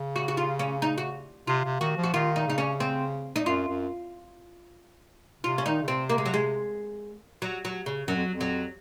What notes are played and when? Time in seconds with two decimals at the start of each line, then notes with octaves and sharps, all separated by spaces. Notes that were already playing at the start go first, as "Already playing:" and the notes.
Already playing: C#3
0.16 F#4
0.28 F#4
0.37 F4
0.59 C#4
0.82 D#4
0.98 F#4
1.47 C3 F4
1.64 C3
1.80 D#3 F#4
1.97 F3
2.03 F#4
2.14 D#3 F4
2.36 D#4
2.47 C#3 D#4
2.58 C#4
2.80 C4
3.36 D#4
3.45 F#2 F4
3.68 F#2
5.43 C3 F4
5.58 C#4
5.66 D#3 D#4
5.82 C#3
5.88 C3 C4
6.09 A#3
6.18 G#3
6.26 F#3
6.34 G#3
7.42 F#3
7.65 F#3
7.86 C#3
8.08 F#2 F#3
8.16 F2
8.30 F2
8.41 F#3